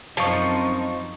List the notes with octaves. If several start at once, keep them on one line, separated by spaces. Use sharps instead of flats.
F#2 F3 C4 D#4 A5 C#6